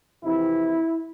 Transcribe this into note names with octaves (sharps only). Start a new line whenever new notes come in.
F2 C3 E3 E4